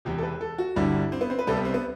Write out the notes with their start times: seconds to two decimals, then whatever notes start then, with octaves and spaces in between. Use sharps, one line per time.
0.05 E1 E2 C3 G4
0.18 A4
0.23 B4
0.41 A4
0.58 F#4
0.76 G1 G2 D3 G3 E4
1.12 C4
1.21 B3
1.30 C4
1.39 B4
1.47 C2 C3 G3 A4
1.56 B3
1.65 C4
1.74 B3